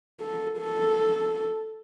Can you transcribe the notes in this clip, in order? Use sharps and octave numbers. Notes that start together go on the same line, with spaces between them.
A4
A4